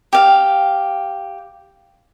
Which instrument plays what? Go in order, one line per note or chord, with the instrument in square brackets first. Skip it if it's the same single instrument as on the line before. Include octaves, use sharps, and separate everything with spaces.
[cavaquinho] G4 F5